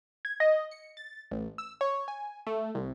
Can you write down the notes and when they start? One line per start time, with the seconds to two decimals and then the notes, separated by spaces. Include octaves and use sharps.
0.25 G#6
0.40 D#5
0.71 C#7
0.97 A6
1.31 A1
1.58 E6
1.81 C#5
2.08 G#5
2.47 A3
2.75 C2